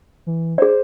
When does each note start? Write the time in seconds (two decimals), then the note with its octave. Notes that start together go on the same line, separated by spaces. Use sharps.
0.26 E3
0.58 G#4 C5 D5